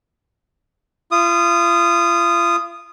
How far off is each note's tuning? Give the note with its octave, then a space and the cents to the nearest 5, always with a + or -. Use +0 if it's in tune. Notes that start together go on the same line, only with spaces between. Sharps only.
F4 -35 D#6 -10